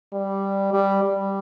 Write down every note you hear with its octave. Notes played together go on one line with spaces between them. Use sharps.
G3
G3
G3